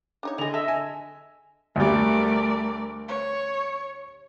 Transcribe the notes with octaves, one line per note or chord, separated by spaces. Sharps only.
D4 D#4 C#5
D3 E4 G#4 D#5 F7
A4 E5
G#5
D2 G3 A3 A#4 D5
C#5